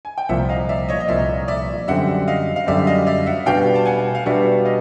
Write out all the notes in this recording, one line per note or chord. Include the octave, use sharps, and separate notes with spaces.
G#5
G5
C2 A#2 F3 E5 F#5
D#5 F5
D5 E5
C#5 D#5
D#5
C2 A#2 F3 D5 E5
D5 E5
F#2 D3 G3 C4 E5 F#5
D#5 F5
F5
F#2 D3 G3 C4 D5 E5
D#5 F5
D5 E5
E5 F#5
B2 G3 B3 D4 F#4 F5 G5
A5
F#5 G#5
F5
B2 G3 B3 D4 F#4 E5 F#5
D#5 F5